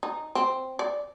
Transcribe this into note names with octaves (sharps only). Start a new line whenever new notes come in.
D#4
C4
D5